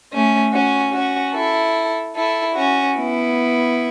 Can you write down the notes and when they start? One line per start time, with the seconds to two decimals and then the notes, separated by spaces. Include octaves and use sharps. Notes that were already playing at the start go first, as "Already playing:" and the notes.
0.11 A3 C#4
0.52 C#4 F#4
0.93 C#4 F#4
1.33 E4 A4
2.16 E4 A4
2.56 C#4 F#4
2.97 B3 E4